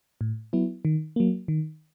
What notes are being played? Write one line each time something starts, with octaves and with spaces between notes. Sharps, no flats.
A2
F#3 B3 E4
D#3
F#3 A#3
D#3